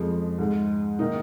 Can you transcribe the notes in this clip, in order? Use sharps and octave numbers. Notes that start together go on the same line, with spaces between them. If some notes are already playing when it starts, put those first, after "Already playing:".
Already playing: F2 F3 G#3
G#2 G#3
D#3 A#3 D#4